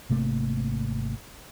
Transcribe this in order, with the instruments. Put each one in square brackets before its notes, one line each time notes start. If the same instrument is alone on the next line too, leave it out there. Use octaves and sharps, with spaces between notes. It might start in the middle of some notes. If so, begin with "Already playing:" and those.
[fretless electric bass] G#1 C3 A3 A#3